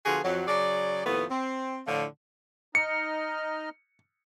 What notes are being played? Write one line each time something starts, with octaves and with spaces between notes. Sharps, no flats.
D3 F3 B3 F4 F#4 G#4
F2 F#3
C#3 F#3 G#4 D5
D#2 A2 F3 A3 B3
C4
A2 D3 F3
D#4 D#5 F6 C#7